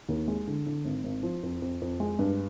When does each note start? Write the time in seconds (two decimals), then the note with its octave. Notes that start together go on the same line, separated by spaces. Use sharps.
0.09 D#2
0.28 G#3
0.47 D3
0.67 D3
0.85 G#1
1.04 G#1
1.23 F3
1.43 F2
1.62 F2
1.82 F2
2.00 G#3
2.19 G2